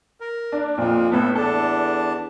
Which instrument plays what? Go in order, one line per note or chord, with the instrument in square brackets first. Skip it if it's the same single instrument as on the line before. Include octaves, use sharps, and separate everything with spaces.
[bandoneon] A#4
[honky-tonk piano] D4
[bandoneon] F2 F3 [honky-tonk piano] A#2
[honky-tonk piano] A2 B3 [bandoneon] A4
[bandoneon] E2 D4 A5 [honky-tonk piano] A4